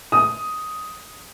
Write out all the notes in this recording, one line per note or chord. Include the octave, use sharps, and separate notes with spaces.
D#6